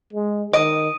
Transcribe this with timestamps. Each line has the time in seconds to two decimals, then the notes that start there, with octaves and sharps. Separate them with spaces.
0.13 G#3
0.53 D#3 D#5 D#6 D7 D#7